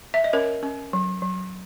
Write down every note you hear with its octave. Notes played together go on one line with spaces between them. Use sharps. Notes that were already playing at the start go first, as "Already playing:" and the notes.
E5
D#5
C#4 A#4 C#5
C#4
F#3
F#3